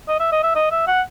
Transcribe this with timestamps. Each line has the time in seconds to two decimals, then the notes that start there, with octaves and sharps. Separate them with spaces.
0.09 D#5
0.20 E5
0.32 D#5
0.43 E5
0.56 D#5
0.71 E5
0.87 F#5